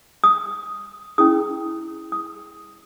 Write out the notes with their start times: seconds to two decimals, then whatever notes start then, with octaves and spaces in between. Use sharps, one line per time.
0.24 D#6
1.18 C#4 E4 G#4 D#6
2.12 D#6